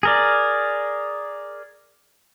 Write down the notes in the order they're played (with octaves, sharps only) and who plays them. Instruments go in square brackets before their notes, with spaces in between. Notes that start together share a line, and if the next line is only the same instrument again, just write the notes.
[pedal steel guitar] G#4 A#4 D5